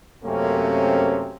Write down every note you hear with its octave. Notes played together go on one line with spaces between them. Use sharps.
F#2 C3 A3 A#3 C4 C#4